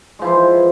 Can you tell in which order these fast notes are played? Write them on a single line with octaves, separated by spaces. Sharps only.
G#3 F3 E4 E3